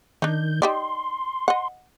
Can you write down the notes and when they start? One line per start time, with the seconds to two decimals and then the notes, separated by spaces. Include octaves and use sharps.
0.22 D#3 D4 D#4 G6
0.62 D#4 G4 D5 C6
1.48 D#5 F#5